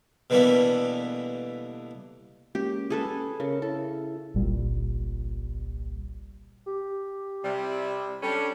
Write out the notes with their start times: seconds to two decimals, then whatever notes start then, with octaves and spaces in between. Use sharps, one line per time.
0.30 B2 D3 E3 G3 A#3 B3
2.55 G#3 A#3 C#4 G4
2.90 G#4 A4 B4
3.13 C#4
3.40 C#3 C#4 A#4 C#5
3.62 E4 A4
4.34 G1 C2 A#2 G3
6.67 G4
7.44 C3 G3 E4
8.23 G3 C#4 D4 A4